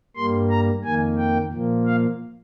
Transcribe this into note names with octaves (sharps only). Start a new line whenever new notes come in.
G2 G3 A#3 C6
A#5
F2 D#3 A#3 G#5
G5
A#2 F3 A#3
F5